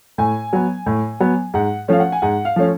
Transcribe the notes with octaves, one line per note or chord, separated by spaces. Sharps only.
A2 G#5
F#3 B3
A2
F#3 B3
G#2 F#5
F3 A3 C#4 F5
F#5
G#5
G#2 F#5
F5
F3 A3 C#4